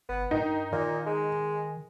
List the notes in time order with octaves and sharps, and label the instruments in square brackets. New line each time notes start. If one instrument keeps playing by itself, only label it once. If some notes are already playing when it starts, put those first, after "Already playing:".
[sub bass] G1 [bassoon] B3
[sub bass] G2 [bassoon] D#3 [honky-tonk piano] D#4
[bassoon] A#2 [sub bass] D#3
[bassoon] G#3